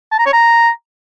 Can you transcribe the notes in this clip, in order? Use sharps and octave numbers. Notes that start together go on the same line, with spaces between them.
A5
A#5
C#5
A#5